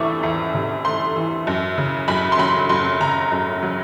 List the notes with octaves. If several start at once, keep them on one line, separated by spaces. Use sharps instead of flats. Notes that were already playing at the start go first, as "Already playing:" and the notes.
Already playing: E2 C3 E3 A3 C#6 D6
E2
C3
A3 C6
E3
F#2
C#3
F#2 B5
C6
F#3 B5
F#2 C6
C#3 A#5
F#2
F#3